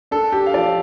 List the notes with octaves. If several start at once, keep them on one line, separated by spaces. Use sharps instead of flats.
D4 A4
G4
F5
F3 D5